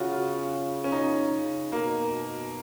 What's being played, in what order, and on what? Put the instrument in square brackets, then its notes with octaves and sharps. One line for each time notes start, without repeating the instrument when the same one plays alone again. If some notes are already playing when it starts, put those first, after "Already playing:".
Already playing: [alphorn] C#3 [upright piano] F4 F#4
[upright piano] F4
C#4
D#4
[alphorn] C#3
[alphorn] B2 [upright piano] A#3
[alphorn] B2